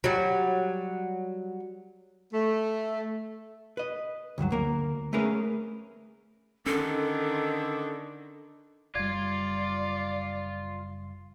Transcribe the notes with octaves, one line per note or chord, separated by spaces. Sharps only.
F#3 G3
A3
B4 D#5
D2 G2 E3 F#3
D2 A#3 A#4
A3 A#3 C#4 G#4 A#4 B4
D3 D#3 C#4 A4
F#1 G3 F4 D5 G#6